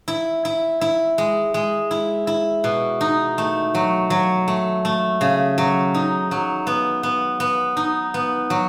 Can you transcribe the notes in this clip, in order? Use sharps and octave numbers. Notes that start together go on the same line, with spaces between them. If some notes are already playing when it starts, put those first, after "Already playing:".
E4
E4
E4
G#3
G#3
E4
E4
B2
D#4
A3
F#3
F#3
A3
A3
C#3
F#3
D#4
F#3
B3
B3
B3
D#4
B3
F#3